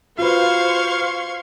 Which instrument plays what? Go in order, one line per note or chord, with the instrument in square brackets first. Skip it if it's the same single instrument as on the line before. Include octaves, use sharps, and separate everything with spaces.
[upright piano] F4 F#4 B4 [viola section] C5 [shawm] F5 [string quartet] C6 C#6 G#6